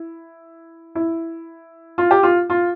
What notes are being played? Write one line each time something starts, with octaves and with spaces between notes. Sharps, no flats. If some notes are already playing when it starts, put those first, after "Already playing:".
Already playing: E4
E4
F4
G4
F4
F4